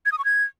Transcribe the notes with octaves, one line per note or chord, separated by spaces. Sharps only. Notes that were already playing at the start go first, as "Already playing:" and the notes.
G#6
D#6
C#6
G#6